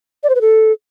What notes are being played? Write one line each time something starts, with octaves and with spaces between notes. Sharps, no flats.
D5
C5
B4
A4